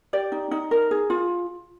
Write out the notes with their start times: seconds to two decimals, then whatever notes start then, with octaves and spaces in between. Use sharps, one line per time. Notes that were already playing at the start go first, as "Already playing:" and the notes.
0.13 G4 D5
0.32 D#4
0.51 D#4
0.71 A#4
0.91 G#4
1.10 F4